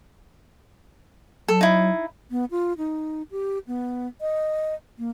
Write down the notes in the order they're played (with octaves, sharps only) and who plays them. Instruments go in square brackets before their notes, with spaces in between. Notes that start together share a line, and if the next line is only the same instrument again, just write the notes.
[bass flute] F#3 [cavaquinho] A4
[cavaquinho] D#4 E4
[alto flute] B3
F4
D#4
G4
B3
D#5
A#3